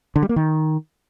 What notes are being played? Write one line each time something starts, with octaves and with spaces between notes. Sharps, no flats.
D3
G3
A#3
D#3